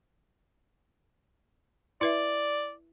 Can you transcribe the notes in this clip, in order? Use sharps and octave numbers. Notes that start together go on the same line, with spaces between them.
E4 B4 D5 E5